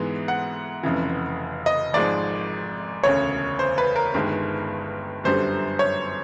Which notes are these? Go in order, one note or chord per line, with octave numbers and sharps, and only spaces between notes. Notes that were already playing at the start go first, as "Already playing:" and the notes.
Already playing: G#2 E3 G#3 B3
F#5
F1 F2 C#3 E3
D#5
G#1 G#2 F3 G#3 D5
E1 D2 C#3 C#5
C5
B4
A#4
G1 G2 D#3 G#3
G1 F#2 D3 G3 C5
C#5